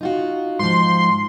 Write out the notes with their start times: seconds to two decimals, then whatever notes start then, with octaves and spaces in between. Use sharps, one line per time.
0.01 D#4 F4 F#4
0.59 G#2 F3 C6